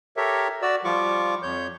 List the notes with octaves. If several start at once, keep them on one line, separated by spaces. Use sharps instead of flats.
G4 A4 A#4 C#5 E5
F#4 D5 E6
F3 G3 F4 C#6 D6
F2 C#5 G6